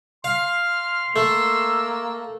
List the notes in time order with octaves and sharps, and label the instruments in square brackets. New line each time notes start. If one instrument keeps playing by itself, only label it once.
[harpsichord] F5 [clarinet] C6 [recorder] F6
[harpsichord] A3 [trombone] A#3 [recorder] E6